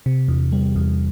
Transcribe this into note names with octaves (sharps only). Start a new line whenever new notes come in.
C3
E2
G3
E2